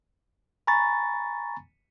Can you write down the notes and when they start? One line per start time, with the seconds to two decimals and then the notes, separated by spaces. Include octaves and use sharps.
0.67 G#5 A#5 B5 C#6 A6